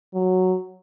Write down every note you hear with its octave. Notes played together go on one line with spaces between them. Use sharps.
F#3